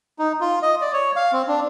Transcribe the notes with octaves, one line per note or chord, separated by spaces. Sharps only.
D#4
F4
D#5
D5
C#5
F5
C4
D4